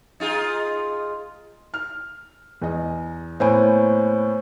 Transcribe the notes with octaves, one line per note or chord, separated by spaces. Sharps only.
D#4 F4 G#4
F6
E2 D#5
A2 A#3 B3 C5 C#5 G#5